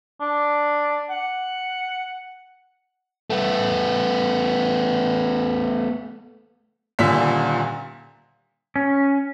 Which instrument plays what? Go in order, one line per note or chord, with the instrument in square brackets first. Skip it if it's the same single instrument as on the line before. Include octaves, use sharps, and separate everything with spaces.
[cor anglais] D4
F#5
[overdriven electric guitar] A3 B3
[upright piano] D#1 A#2 D3 B6
[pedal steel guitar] C#4